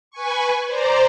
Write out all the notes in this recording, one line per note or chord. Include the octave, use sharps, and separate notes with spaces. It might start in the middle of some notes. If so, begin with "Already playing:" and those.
B4 G#5 C#6
C5 D5 A#5